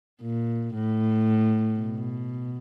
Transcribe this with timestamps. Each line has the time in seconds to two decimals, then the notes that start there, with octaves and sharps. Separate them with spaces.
0.22 A#2
0.74 A2
1.79 B2